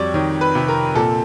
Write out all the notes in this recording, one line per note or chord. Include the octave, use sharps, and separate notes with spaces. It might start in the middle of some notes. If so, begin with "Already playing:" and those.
Already playing: F2 G3 F#4 G4 C#5 D5
D#3 C#5
B4
C3
A#4
A#2 A4